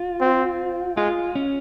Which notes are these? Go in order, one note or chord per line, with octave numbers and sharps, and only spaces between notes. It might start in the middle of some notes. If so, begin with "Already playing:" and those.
Already playing: F4
C4
G#3 F4
C#4